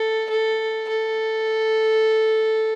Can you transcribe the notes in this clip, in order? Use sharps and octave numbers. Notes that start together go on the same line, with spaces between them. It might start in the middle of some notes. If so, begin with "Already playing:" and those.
Already playing: A4
A4
A4